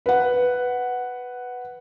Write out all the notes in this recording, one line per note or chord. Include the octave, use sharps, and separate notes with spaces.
B4 F#5